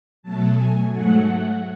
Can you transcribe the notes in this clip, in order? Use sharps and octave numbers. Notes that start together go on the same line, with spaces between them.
B2 F#3 A3 A5
G#5
G#2 F#3 A3 F#5